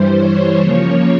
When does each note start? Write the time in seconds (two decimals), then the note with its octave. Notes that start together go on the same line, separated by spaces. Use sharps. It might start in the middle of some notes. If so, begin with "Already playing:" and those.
Already playing: G2 E3 G3 C5
0.17 C#5
0.59 C#3 F3 A#3 C#5